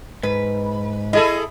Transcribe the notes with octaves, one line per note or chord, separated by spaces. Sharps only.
G#2 B4
E4 G#4 A4 D#5